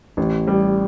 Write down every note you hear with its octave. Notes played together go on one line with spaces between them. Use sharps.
A1
G3